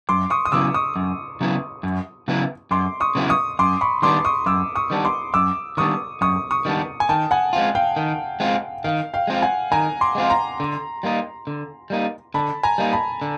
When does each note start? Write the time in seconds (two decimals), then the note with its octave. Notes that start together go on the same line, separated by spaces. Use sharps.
0.09 F#2 C6 D6
0.30 C#6 D#6
0.45 D#6
0.52 C#3 F#3 B3 E4 D6 E6
0.74 C#6 D#6
0.96 F#2
1.41 C#3 F#3 B3 E4
1.83 F#2
2.28 C#3 F#3 B3 E4
2.71 F#2 C6 D6
3.00 C#6 D#6
3.15 C#3 F#3 B3 E4
3.30 C#6 D#6
3.59 F#2 C6 D6
3.81 B5 C#6
4.02 D#3 G3 B3 D4 C6 D6
4.25 C#6 D#6
4.46 F#2 D6 E6
4.75 C#6 D#6
4.90 D#3 G3 B3 D4
5.05 C6 D6
5.34 F#2 D6 E6
5.77 D#3 G3 B3 D4 C#6 D#6
6.21 F#2 C#6 D#6
6.51 C#6 D#6
6.65 D#3 G3 B3 D4
7.00 G#5
7.09 D#3 G5 A5
7.31 F#5 G#5
7.53 G#3 C4 F4
7.75 F5 G5
7.96 D#3
8.40 G#3 C4 F4
8.84 D#3 F5
9.14 F5 G5
9.27 G#3 C4 F4
9.42 F#5 G#5
9.72 D#3 G#5 A#5
10.01 C6 D6
10.15 G#3 C4 F4
10.30 A#5 C6
10.60 D3
11.03 G3 A#3 D#4
11.47 D3
11.90 G3 A#3 D#4
12.34 D3 A5 B5
12.63 G#5 A#5
12.78 G3 A#3 D#4
12.93 A5 B5
13.21 D3